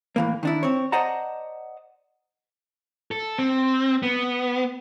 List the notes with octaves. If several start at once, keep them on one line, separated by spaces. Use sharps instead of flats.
A2 E3 A#3
D#3 D4 E4
C4 C#5
C5 D5 D#5 F#5 A5 A#5
A4
C4
B3